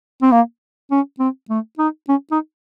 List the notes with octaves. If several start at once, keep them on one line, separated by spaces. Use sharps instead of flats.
C4
A#3
C#4
C4
A3
D#4
C#4
D#4